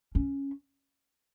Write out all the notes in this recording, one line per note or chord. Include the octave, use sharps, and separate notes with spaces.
C#4